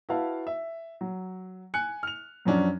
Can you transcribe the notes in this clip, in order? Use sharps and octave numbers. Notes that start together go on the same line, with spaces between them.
E4 F#4 B4 F5 A5
E5
F#3
G#5 F#6 C#7
F6 F7
F#2 F3 F#3 C#4 D4